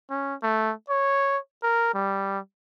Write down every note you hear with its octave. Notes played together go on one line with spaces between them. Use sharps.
C#4
A3
C#5
A#4
G3